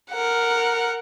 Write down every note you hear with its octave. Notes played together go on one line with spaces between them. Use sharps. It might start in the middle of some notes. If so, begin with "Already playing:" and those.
A#4 F#5